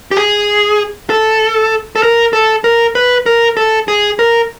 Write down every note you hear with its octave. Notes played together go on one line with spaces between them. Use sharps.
G4
G#4
A4
A4
A#4
A4
A#4
B4
A#4
A4
G#4
A#4